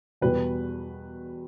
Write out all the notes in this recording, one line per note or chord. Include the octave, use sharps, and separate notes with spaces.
E2 B2 G3 B4